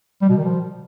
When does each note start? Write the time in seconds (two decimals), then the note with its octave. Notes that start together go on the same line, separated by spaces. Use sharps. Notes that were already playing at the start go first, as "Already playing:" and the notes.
0.21 G3
0.29 B2
0.37 D#3
0.44 F3